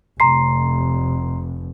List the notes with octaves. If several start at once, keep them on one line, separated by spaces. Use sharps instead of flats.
F1 A#5 C6 C7